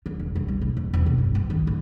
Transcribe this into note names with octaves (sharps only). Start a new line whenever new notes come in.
D3
F1
G3
B1
A2
F2
E1
B3
G2
G#1
D#3
A1